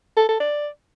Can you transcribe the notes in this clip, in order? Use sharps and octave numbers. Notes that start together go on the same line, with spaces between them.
A4
A4
D5